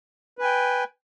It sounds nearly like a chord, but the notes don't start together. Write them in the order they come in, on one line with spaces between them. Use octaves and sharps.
B4 G#5 G5